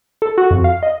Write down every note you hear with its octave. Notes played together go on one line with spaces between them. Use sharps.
A4
F#4
F2
F5
D#5